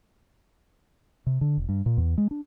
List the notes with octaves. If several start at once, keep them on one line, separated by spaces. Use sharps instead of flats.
C3
D3
E1
G2
A#2
E2
G#3
D4